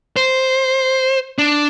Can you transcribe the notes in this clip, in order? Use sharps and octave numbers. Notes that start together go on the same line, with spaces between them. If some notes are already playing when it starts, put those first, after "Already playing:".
C5
D4